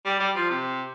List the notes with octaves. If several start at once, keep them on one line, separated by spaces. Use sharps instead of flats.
G3
G3
F3
C3